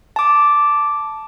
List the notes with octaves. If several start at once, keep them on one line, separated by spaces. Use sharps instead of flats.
A5 D6